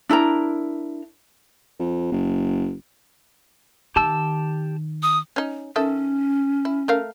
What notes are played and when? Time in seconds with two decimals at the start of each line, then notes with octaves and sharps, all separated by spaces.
0.09 D4 E4 A#4 A#5
1.79 F2
2.12 F#1
3.96 D#3 G4 A5 E6
5.03 D#6
5.36 C#4 D#4
5.76 D#3 C#4 A4 E5
6.65 E4
6.88 A3 A#4 F5